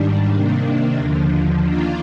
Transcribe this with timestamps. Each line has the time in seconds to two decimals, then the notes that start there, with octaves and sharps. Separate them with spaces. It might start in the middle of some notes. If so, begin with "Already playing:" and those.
Already playing: G#2 D#3 G3 D4
0.31 C3 D#3 A#3 D4
0.97 D#2 D3 F3
1.63 D#3 A#3 D4 F4